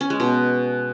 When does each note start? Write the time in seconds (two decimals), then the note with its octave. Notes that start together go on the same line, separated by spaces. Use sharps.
0.01 C#4
0.10 G#3
0.20 B2